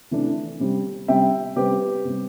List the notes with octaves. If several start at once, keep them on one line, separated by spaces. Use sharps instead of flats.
C3 E3 A3 D4
C3 G3 C4
C3 G3 C4 E5 G5
C3 G3 C4 G4 B4
C3 G3 C4